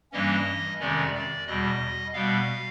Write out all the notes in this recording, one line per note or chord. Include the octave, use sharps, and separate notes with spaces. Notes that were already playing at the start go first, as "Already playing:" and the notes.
G2 E3 G3 A#3 C#4 D#5
F2 C3 D#3 G#3 C#4 D5
D5
E2 B2 G3 D#5
B2 G3 B3 F5